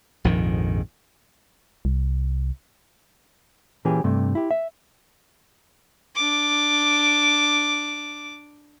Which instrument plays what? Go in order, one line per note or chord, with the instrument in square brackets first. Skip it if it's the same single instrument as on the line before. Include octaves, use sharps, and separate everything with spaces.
[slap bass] A#1 F2 G#2 D#3
[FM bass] C2
[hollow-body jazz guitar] A#2 E3 C#4 G4 G#4
G2 C3 A3
E4 G4
E5
[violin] D4 D6